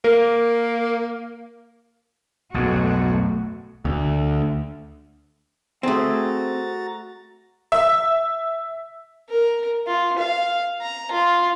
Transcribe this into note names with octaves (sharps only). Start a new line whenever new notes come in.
A#3 A#4
B1 F2 G#2 A3 F#4
D2
A3 C4 F#4 G#4 A#5 A6
E5
A#4
F4
F5
A#5
F4